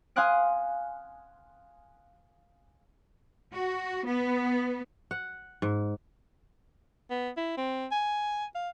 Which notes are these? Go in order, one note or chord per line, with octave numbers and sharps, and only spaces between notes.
F5 G#5 C6 D#6 F#6 D7
F#4
B3
F#5
G#2
B3
E4
C4
G#5
F5